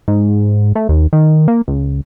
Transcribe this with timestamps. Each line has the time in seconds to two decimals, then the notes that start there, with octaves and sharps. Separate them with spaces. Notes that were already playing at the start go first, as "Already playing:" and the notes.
0.08 G#2
0.75 A3
0.89 D#2
1.13 D#3
1.48 A#3
1.68 C#2